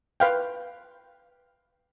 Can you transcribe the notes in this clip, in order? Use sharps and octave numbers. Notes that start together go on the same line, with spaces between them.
B4 F5 G5